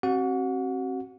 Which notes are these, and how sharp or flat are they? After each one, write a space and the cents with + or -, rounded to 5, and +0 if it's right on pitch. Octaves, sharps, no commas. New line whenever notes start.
C4 +30 F#4 +35 F#5 -30